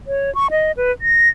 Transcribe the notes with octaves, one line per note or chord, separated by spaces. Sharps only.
C#5
C#6
D#5
B4
A#6